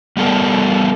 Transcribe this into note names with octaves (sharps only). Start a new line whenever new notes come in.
G3 B3 A4 A#4 D5